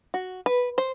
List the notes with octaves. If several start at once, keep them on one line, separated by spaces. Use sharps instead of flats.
F#4
B4
C5